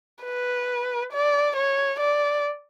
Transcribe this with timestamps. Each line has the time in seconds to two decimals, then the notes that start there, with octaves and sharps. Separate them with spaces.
0.24 B4
1.13 D5
1.56 C#5
2.00 D5